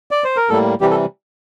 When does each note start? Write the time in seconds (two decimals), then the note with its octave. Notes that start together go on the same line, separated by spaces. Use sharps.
0.11 D5
0.24 C5
0.37 A#4
0.49 A2 G3 A#3 A4
0.81 C3 E3 G3 G4
0.91 A4